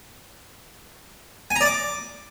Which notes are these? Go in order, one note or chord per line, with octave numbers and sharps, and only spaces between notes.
G#5
A#5
D5
D6